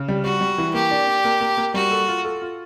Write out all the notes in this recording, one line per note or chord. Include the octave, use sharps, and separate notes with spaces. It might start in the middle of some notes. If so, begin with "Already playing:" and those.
Already playing: C#3
G3
G3 F#4
G3
E3
A#3 G4
D4
D4
A#3
A#3
A#3
G3 F#4
A4
F4
A4
F4